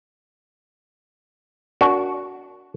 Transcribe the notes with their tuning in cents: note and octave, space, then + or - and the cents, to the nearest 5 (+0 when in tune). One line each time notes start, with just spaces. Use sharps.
D4 -30 F#4 +0 A#4 +0